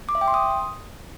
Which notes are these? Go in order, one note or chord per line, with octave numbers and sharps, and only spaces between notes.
D6
E5
G5
C6
D#6